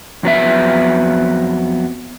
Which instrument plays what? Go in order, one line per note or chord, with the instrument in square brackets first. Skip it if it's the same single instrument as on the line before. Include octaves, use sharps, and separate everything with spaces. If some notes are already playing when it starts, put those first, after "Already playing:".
[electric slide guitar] F2 F#3 B3 E5